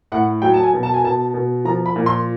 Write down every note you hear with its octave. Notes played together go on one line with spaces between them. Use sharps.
A2 F#5
F#3 G5
A5
G#5
B2
A5
G#5
B2 A5
B2
F3 A#5
B5
A#2
C6